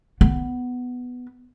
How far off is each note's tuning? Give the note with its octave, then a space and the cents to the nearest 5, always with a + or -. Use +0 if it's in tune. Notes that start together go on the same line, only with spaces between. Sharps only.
B3 +5